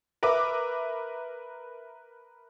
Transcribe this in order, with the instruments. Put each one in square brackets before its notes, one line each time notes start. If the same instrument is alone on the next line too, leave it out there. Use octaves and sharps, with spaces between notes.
[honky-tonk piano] A#4 B4 E5 D6